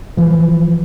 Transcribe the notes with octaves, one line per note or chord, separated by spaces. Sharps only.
E3 F3